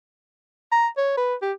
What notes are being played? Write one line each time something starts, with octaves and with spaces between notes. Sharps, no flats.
A#5
C#5
B4
G4